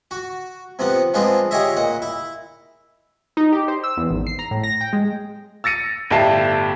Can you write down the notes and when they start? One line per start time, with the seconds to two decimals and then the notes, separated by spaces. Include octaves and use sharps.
0.11 F#4
0.79 C3 F3 B3 F#5
1.14 F3 G#3 B3 C4 D4 F4
1.51 F4 G4 G#4 C#5 D#5 E5
1.76 A#2 D#5 F#5
2.02 E4
3.37 D#4
3.52 G4
3.68 C5
3.84 E6
3.97 E2
4.10 G#1
4.27 C7
4.39 A#5
4.51 A2
4.63 A#6
4.81 G5
4.93 G#3
5.64 E6 A6 A#6 C#7 D#7
6.10 G1 A2 E4 G4 A5 C7